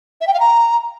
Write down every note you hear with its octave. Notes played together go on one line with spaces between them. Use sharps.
E5
G5
F5
A#5